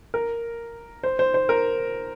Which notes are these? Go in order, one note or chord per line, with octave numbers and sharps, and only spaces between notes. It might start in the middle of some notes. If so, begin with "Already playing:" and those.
A#4
C5
C5
C5
A#4